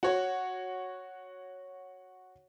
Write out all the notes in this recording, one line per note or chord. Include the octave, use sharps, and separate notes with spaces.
F#4 C#5